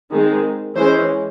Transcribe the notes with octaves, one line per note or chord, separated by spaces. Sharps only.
D#3 G#3 C4
E3 G#3 C#4 C5